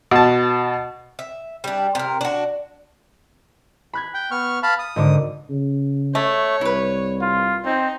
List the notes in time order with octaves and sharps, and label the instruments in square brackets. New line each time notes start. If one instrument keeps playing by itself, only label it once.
[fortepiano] B2 A5
[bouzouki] E5
G3 D4
C3 A#4
D4 F#4
[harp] B5 F#6 G#6
[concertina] G5
B3 C#6 F6
F5 A5 B5
D#6
[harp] G#1 D3 D6
[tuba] C#3
[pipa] A3 [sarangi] C#5
[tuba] C2 [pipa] E4 B4
[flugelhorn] F4
[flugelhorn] C4 [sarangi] D#4